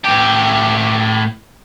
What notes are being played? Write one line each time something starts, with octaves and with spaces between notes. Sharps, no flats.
A2 G4